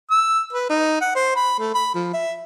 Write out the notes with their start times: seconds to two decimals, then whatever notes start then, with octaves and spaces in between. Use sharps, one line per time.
0.10 E6
0.53 B4
0.69 D#4
1.01 F#5
1.15 C5
1.36 B5
1.59 A3
1.74 B5
1.95 F3
2.14 E5